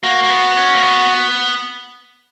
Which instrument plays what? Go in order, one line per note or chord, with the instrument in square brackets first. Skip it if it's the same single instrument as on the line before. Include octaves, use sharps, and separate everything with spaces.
[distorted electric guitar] A#3 [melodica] F#4
[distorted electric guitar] A#3
B3
C#4
A#3
B3